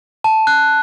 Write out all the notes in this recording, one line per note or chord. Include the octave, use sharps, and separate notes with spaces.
A5
F#6